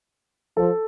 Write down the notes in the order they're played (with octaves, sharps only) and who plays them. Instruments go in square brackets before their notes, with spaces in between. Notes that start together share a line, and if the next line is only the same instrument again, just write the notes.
[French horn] F3 [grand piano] A4